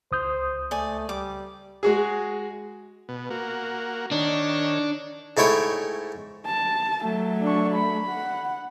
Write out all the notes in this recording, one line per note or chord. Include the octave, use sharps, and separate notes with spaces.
C#2 C5 D#6 G6
A3 D5 G#5
G3 D6
G#3 F#4 G#4
B2
A#3 F#4
D#3 D4 C#5
G#2 A3 E4 C#5 G5
A5
F#3 A3
D4 C#6
B5
F#5